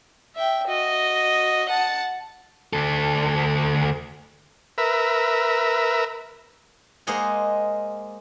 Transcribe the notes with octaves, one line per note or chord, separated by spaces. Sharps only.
E5 G5
F#4 D#5
F#5 A5
D2 A4
A#4 B4 E5
G#3 A#3 C5 D#5 F#5 G#5